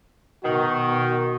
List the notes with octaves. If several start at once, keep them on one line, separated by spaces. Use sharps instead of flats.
B2 D#3 F#4